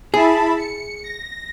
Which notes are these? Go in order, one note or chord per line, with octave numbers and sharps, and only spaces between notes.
E4 G#4 A5 B5
C#7
A#6